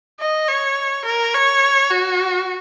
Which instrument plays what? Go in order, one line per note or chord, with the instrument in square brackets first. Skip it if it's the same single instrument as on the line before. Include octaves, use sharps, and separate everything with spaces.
[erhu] D#5
C#5
A#4
C#5
F#4